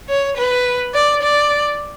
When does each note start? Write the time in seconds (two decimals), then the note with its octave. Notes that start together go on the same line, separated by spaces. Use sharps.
0.09 C#5
0.37 B4
0.94 D5
1.22 D5